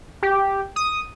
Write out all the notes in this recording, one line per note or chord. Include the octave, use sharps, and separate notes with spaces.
G4
D#6